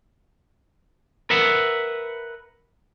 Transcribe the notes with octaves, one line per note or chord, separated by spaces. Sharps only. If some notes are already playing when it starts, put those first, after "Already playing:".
A#4 B4 E5 F#5